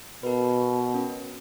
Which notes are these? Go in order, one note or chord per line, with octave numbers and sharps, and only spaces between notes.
B2 A#4 B4
C#4